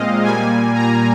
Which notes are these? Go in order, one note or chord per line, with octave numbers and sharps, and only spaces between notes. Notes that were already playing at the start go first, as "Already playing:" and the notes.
Already playing: A#2 G#3 C4 D#5 F5
A#2 G3 A#3 G#5
A#5